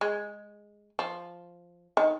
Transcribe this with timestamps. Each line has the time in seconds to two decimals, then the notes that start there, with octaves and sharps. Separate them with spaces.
0.01 G#3
0.99 F3
1.97 D#3